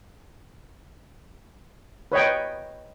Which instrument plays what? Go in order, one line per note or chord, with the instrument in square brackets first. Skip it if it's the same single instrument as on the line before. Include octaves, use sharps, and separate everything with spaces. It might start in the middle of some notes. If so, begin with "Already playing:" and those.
[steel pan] B4 C#5 D#5 G5